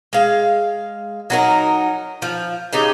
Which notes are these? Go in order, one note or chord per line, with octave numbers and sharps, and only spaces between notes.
G#3 F5
F#3 D#4 A#4
F3
C#3 D#4 G4